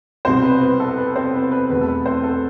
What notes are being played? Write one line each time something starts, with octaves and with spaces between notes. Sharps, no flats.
C2 B2 G3 B3 C4 C5
B4
B4
A4
B4
C4 C5
B4
B4
E2 B2 A3 C4 B4
A4
B4
C4 C5
A4